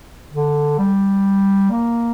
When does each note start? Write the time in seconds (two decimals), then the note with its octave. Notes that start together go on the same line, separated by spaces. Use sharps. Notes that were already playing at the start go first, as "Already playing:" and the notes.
0.33 D3
0.79 G3
1.71 A#3